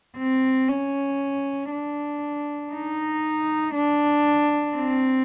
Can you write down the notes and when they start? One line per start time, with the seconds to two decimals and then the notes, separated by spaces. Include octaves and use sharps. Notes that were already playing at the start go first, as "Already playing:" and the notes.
0.18 C4
0.69 C#4
1.71 D4
2.72 D#4
3.75 D4
4.76 C4